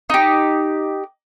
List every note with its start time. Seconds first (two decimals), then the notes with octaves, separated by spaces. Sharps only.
0.10 D#4 G4